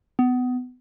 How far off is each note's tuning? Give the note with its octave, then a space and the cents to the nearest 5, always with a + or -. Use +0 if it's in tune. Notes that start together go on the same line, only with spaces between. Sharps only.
B3 +25